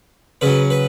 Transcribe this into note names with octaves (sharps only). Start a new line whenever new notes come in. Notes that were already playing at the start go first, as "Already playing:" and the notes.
C#3 F#3 B4
B4